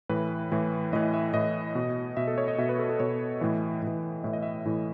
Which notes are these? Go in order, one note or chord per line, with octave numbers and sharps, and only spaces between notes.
A2 E3 B4
A2 E3
A2 E3 D#5
E5
A2 E3 D#5
B2
B2 E5
A4
C#5
D#5
B2 E5
B4
A4
A4
B2 C#5
A2 E3 D#5
A2 E3
A2 E3 E5
D#5
E5
A2 E3